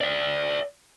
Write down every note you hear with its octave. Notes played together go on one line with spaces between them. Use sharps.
D5 E5